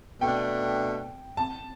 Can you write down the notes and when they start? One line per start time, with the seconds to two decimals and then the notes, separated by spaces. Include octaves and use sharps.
0.21 B2 A3 D4 G5
1.37 A5